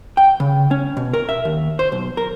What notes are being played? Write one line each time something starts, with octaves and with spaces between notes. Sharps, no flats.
G5
C#3
C#4
B2
A#4
E5
D#2
C5
B1
A#4